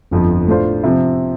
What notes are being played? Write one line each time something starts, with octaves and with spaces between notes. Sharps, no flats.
G1 F2 F3
A2 A3 D4 F4 C5
C3 F3 C4